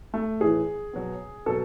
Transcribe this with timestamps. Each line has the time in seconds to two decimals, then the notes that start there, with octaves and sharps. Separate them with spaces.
0.14 A3
0.40 A2 E3 G#4
0.94 B2 F#3
1.46 B2 F#3 A4